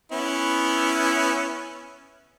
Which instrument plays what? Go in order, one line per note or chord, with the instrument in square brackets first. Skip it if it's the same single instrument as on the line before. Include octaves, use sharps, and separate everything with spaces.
[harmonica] B3 C#4 E4